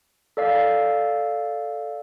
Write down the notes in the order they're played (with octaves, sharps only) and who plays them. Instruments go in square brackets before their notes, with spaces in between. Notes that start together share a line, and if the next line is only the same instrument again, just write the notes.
[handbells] A4 D5 F5